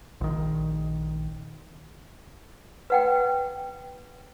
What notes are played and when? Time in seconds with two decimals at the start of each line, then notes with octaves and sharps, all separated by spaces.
0.21 A#1 D#3
2.90 B4 F#5 G5